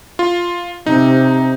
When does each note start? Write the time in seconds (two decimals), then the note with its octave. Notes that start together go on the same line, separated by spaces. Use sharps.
0.19 F4
0.86 C3 D#4